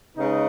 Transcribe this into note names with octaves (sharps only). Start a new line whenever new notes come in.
C#3 G#3 B3 D#4